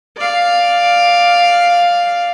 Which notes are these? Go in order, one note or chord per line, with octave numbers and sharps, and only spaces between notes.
D5 F5